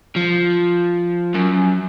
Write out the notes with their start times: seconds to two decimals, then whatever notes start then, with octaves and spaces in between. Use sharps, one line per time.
0.16 F3
1.35 F#2